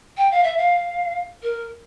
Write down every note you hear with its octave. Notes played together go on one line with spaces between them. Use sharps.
G5
F5
E5
F5
A#4